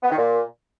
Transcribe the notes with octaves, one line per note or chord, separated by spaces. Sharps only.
B3
D#3
A#2